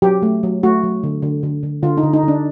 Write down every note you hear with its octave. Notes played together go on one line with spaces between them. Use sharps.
F#3 G4
A3
F#3
A3 F#4
F#3
D3
D3
D3
D3
D3 F4
D#4
D3
D#4
D3
D4